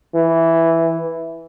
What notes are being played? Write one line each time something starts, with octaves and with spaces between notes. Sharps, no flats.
E3